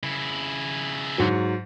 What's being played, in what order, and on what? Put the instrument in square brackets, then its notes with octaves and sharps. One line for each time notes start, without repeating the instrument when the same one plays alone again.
[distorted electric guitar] C#3 E4
[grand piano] G#2 F#3